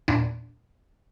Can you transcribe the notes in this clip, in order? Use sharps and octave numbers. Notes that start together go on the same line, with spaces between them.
E2 A#2 D4